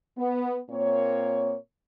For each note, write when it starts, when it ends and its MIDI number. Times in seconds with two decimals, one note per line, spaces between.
0.17 0.58 59
0.70 1.55 46
0.70 1.55 58
0.70 1.55 60
0.70 1.55 73